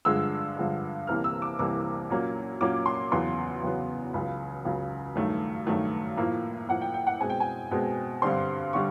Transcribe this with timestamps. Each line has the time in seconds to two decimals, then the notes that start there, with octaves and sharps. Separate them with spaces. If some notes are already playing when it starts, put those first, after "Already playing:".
0.05 G2 D3 F3 G#3 E6
0.57 G2 D3 F3 G#3
1.07 C2 C3 E3 G3 A#3 F6
1.24 E6
1.42 D6
1.59 C2 C3 E3 G3 A#3 D6
2.10 A#2 F#3 A#3 C#4
2.61 A#2 F#3 A#3 C#4 D6
2.86 C6
3.12 E2 C#3 F#3 B3 C6
3.63 E2 C#3 F#3 B3
4.14 C#2 C#3 F#3 B5
4.65 C#2 C#3 F#3
5.15 G2 D#3 F#3 A3
5.67 G2 D#3 F#3 A3
6.17 A2 F3 A#3
6.68 A2 F3 A#3 F#5
6.81 G5
6.94 G5
7.07 F#5
7.20 B2 G#3 C4 G#5
7.30 G5
7.40 G#5
7.71 B2 G#3 C4
8.22 G2 D3 G3 C4 C6
8.73 D3 G3 C#6